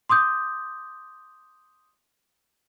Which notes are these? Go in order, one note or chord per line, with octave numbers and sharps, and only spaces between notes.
C6 D6 D#6 G6